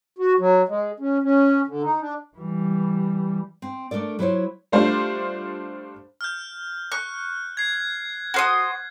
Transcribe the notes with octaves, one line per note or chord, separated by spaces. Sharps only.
F#4
F#3
G#3
C#4
C#4
D3
D#4
D4
E3 G3
C4
A3 D4 A4 A#4 D5
F#3 E4 F4 A#4 C5 C#5
G3 A3 D4 F4 C5
F6 G6
C#6 F#6
G#6 C7
F#4 C5 D#6